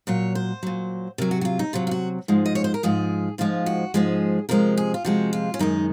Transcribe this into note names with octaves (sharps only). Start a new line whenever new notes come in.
A#2 F#3 C#5
C5
A#2 F#3
C3 F#3 A#4
F#4
F#4
F4
D#4
C3 F#3 F4
F4
F#4
G#2 F3 G#3
D#5
C#5
C5
A#4
G#2 F3 G#3 G#4
G#2 F3 G#3 F4
F#4
G#2 F3 G#3 G#4
C3 F3 G#3 A#4
G#4
F4
C3 F3 G#3 F#4
F4
C#4
F#2 D#3 G#3 D#4